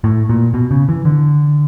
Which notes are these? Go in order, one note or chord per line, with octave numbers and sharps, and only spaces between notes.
A2
A#2
B2
C#3
E3
D3